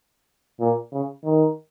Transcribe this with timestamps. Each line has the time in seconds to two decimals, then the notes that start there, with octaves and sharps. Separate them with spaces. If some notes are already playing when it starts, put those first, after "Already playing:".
0.61 A#2
0.92 C#3
1.24 D#3